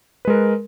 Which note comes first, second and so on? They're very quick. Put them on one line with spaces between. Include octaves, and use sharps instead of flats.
B4 G#3 A#4